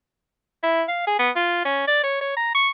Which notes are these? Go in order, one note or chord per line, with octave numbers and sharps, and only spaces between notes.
E4
F5
G#4
B3
F4
C#4
D5
C#5
C#5
A#5
C#6